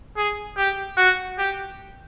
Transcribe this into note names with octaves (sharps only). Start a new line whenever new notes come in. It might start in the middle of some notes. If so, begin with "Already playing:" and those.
G#4
G4
F#4
G4